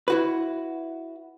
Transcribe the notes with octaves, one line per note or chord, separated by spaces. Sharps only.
E4 F#4 B4